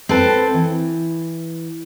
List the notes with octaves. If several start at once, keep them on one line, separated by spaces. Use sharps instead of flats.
C4 A4 B4
E3